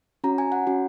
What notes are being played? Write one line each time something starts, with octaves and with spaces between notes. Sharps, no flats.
C#4 F#4 A#5
G#5
F#5
C#4 F#4